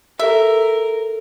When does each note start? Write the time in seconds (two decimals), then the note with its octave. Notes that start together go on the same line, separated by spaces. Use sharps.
0.19 G4 A4 A#4 E5